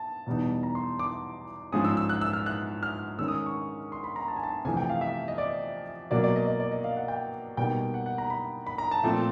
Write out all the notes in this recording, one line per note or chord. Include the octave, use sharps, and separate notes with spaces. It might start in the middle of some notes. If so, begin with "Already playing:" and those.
Already playing: A5
E2 B2 G3 B3 D#4
A#5
C6
D6
G#2 F3 G#3 C#4 D#6
E6
E6
F#6
E6
F6
F#6
F6
D#3 G#3 C#4 E6
D#6
C#6
C6
B5
A#5
A5
G#5
A5
F2 C3 E3 A3 G#5
G5
F5
E5
D#5
D5
B2 F#3 A#3 D5
D5
D#5
D#5
D5
D#5
F5
F#5
G5
B2 G3 A#3 D#4 G5
F#5
F#5
A#5
B5
B5
A#5
A5
A#2 F3 A3 C4